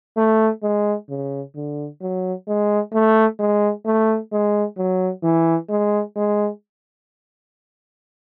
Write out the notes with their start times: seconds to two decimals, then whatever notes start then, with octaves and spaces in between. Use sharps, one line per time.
0.17 A3
0.63 G#3
1.09 C#3
1.55 D3
2.01 F#3
2.48 G#3
2.94 A3
3.39 G#3
3.85 A3
4.32 G#3
4.78 F#3
5.24 E3
5.69 G#3
6.16 G#3